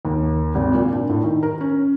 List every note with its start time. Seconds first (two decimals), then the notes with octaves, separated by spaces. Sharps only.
0.05 D#2
0.55 G#1
0.75 A#2
0.92 D4
1.10 A2
1.24 D#3
1.43 A#4
1.60 C#4